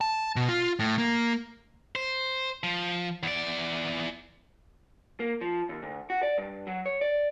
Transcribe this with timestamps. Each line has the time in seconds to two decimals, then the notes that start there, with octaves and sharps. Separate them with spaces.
0.01 A5
0.36 B2
0.48 F4
0.79 A2
0.98 A#3
1.95 C5
2.63 F3
3.23 E2 D5
5.20 A#3
5.41 F3
5.69 D#2
5.83 D2
6.10 F#4
6.23 D5
6.38 G2
6.67 F#3
6.86 C#5
7.01 D5